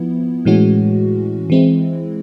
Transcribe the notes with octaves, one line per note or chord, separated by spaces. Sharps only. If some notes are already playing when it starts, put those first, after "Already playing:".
Already playing: F3 B3 E4
A2 E3 G#3 C#4 F#4
E3 G#3 C4 E4